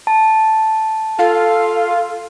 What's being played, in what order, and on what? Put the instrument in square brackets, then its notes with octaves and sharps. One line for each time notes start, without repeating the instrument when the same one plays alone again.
[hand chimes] A5
[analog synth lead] F4 [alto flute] A4 [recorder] F5